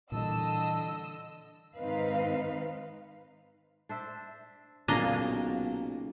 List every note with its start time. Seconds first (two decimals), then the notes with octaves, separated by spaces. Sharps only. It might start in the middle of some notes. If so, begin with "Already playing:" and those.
0.12 A#2 D3 E3 G3 D#5 A5 E6
1.76 G#2 D#3 C4 D#4 B4 F5
3.89 D4 C5 E5
4.88 B1 A#2 C#3 A#3 D4 D#5 A#5